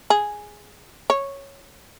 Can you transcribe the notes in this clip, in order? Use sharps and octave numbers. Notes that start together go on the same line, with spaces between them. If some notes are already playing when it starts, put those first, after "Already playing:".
G#4
C#5